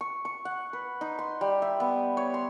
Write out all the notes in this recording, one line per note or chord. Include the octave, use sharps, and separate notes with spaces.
C#6
C#6
F#5
B4
D#4
C6
G3
E5
B3
C#5
C6